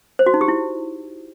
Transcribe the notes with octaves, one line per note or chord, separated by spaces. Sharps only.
C5
F#4
D#4
G4
E4